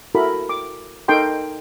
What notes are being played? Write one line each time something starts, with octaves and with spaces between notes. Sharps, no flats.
E4 F#4 A4 A#4 B5
D6
D#4 A4 A#4 G5 C6